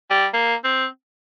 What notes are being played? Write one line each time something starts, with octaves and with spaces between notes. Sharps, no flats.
G3
A#3
C4